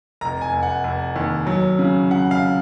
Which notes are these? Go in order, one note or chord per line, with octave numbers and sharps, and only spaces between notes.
F1 A#5
G#5
F1
F#5
F1
D#2
F#3
C#3
C#3 F#5
F5
C#3